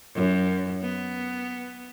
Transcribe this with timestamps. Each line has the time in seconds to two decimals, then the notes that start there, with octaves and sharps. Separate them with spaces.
0.15 F#2
0.81 B3